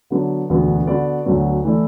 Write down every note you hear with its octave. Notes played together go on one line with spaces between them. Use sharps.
D3 F#3 B3 D4
E1 D2 D3 B3 F#4
D3 B3 F#4 B4 D5
D2 D3 F#3 B3
E3 A3 E4 D5